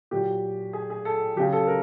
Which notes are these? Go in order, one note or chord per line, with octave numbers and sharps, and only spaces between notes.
A#2 F#3 G4
G#4
G#4
A4
C#3 F#3 G4
A4
A#4